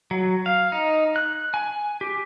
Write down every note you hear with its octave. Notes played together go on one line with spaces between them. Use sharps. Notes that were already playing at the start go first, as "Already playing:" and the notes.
F#3
F5
D#4
F#6
G#5
G4